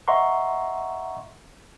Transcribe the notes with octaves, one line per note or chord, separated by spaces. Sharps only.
D#5 E5 F#5 A#5 C6 C#6